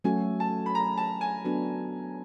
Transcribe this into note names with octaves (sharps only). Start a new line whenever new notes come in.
F#3 A3 C#4 F#4 A4 G#5
A5
B5
A#5
A5
G#5
F#3 B3 D4 F#4 A4